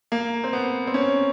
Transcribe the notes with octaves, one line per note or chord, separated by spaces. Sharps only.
A#3
C4
B3
C4
C#4